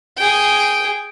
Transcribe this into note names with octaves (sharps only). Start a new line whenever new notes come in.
G#4 G5